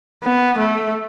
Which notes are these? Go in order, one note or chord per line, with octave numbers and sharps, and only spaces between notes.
B3
A3